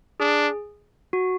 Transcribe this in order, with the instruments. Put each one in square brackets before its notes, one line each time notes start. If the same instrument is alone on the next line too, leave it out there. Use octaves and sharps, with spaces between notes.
[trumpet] D4 [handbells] G#4
[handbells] F#4